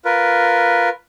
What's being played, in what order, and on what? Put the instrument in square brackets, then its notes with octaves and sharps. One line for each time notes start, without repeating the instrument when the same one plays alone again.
[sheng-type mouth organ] F4 A#4 B4